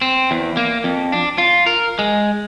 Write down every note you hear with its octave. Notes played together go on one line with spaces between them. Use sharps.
C4
E2
A#3
F2
D4
F4
A#4
G#3